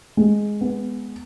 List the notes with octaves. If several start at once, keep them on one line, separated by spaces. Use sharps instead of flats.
G#3
B3